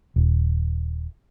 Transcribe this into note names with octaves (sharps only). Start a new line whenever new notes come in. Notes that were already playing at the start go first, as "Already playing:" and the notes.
D#1